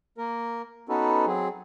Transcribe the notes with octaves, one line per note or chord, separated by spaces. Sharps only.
A#3 A#4
B3 C#4 D#4 F#4 A4 B4
F#3 C4 G#4